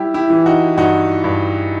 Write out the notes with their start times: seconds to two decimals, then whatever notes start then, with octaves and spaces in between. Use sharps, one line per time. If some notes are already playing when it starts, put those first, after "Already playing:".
Already playing: G3 E4 G4
0.14 E4 G4
0.30 E3
0.46 D#4 F#4
0.77 G2 D#4 F#4
1.24 G2